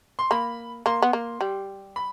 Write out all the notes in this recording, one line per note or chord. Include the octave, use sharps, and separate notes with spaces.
C6
A#3 B5
A#3 C6
B3
A#3
G3
B5